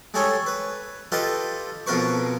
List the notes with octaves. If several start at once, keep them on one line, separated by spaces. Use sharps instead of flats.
G3 G#3 G#4 A4 C#5
B4
F4 G4 A4 B4 D#5
F2 B2 F4 A#4 B4 C#6